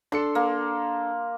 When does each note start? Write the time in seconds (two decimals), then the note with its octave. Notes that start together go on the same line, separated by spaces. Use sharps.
0.12 D4 A4 C6 C#7
0.35 A#3